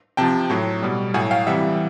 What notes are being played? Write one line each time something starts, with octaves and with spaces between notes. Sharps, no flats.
C3 F3 G5 A5
A2 F#3
B2 G3
A2 F#3 F#5 G#5
F5 G5
C3 E3 G3 E5 F#5